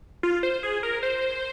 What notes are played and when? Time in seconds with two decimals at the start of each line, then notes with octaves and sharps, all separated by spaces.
0.23 F4
0.43 C5
0.63 G#4
0.83 A#4
1.03 C5